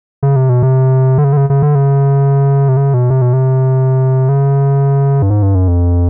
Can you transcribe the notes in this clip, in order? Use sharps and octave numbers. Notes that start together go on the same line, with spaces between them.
C#3
C3
B2
C3
D3
C#3
D3
C#3
C#3
D3
C#3
C3
C#3
B2
C3
B2
C3
C#3
G2
G#2
G2
F#2
F2